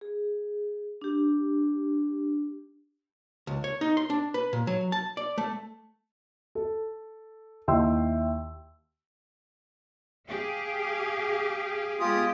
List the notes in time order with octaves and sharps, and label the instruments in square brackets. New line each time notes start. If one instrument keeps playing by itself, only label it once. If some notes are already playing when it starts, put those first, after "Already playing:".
[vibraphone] G#4
D4 G4
[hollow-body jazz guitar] C#2
C#5
D#4
C6
D4
B4
A#2
F#3
A5
D5
A3
[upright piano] A4
D#2 E4 G5 C6 E6
[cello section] G4 G#4 F5
[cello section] G#3 B3 G4 [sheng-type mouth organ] F4 G#4 D#6